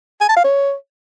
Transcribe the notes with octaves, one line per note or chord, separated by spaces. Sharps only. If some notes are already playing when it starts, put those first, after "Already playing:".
G#5
A5
F5
C#5